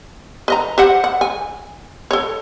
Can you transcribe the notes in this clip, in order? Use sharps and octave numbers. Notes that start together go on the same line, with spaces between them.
B4 D#5 A#5
G4 C5 F#5
F#5
G#5
A4 C#5